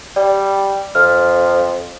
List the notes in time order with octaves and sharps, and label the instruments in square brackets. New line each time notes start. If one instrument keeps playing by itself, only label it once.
[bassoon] G3 [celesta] D5
[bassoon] F2 [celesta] F6